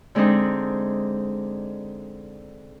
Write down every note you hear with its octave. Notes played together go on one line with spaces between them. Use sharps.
D3 G#3 C4 D4 D#4